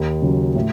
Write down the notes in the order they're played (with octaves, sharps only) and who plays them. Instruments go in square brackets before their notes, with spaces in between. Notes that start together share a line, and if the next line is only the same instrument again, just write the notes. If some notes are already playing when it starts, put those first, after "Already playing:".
Already playing: [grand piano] D#2
C#3 F#3
A2